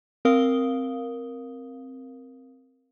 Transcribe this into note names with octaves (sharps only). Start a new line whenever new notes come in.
C4 A#4 F5 D#6 G7